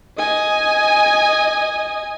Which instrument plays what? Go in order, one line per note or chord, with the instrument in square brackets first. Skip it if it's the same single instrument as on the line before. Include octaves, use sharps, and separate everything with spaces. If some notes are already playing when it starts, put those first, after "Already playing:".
[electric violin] D#5 G#5